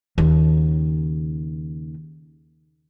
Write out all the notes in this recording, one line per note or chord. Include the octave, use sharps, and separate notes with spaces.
D#2 C#3